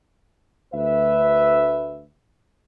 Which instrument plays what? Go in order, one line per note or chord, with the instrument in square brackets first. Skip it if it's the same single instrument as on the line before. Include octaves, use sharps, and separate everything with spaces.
[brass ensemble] D2 B4 E5